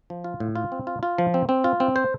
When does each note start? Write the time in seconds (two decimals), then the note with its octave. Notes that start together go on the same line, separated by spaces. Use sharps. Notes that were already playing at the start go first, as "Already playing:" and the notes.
0.10 F3
0.24 F4
0.40 A2
0.55 F4
0.72 C4
0.87 F4
1.03 F4
1.18 F3
1.34 C4
1.49 C4
1.64 F4
1.80 C4
1.96 C5